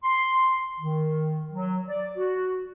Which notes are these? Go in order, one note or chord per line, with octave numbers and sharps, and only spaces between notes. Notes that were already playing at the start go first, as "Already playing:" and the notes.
C6
D#3
F#3
D5
F#4